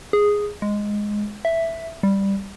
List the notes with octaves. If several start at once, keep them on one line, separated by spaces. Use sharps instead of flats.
G#4
G#3
E5
G3